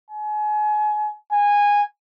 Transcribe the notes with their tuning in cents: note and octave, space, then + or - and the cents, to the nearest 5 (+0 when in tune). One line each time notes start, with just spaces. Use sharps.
G#5 +30
G#5 -15